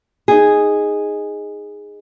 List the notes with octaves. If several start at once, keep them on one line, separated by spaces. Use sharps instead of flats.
D#4 G#4